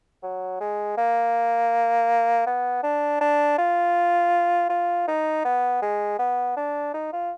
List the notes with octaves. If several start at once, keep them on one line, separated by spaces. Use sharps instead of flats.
F#3
G#3
A#3
B3
D4
D4
F4
F4
D#4
B3
G#3
B3
D4
D#4
F4